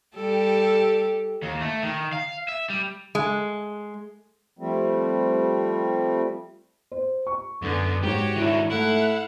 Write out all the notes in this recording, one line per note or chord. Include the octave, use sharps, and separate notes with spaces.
G3 G4 A4
D#2
A3
D#3
F5
E5
G3
G#3
F3 G3 A3 C4
C5
C#6
F#2 D3 B3
G#2 F#4 G4 C#5
D#3 D4 E4
A3 E4 F5 F#5